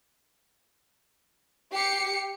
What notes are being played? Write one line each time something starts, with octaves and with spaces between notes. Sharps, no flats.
G4 C7 C#7